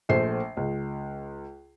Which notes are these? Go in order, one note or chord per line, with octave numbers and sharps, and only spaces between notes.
A#1 A3 C5 C7
C#2